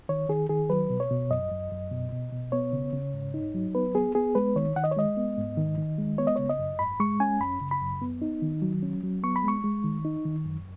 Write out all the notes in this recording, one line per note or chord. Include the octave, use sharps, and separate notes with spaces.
D#3 C#5
D#3 G#4
D#3 G#4
F#3 B4
B2
C#5
B2
F#2 D#5
F#2
F#2
B2
B2
B2
B3 C#5
C#3
C#3
G#2
D#4
F#3
B3 B4
B3 G#4
B3 G#4
G#3 B4
D#3 C#5
D#3 F#5
D#5
C#5
G#3 D#5
B3
G#2
D#3
D#3
G#3
B3 C#5
D#5
C#3 C#5
D#5
F#2
G#2 B5
G#3 C#6
C#4 G#5
F#2 B5
C#3
B5
F#2
B3
D#4
D#3
F#3
C#4
F#3
B3 C#6
B5
G#3 C#6
G#3
D#3
D#4
D#3
F#2